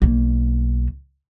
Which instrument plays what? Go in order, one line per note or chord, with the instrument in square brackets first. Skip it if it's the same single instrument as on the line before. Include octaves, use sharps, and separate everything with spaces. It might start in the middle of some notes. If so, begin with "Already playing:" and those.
[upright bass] B1 A#3